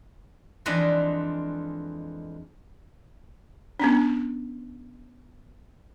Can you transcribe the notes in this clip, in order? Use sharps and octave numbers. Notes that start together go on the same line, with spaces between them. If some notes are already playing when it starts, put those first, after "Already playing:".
F2 E3 G#3 D4 G#4 D#5
B3 C#4 D4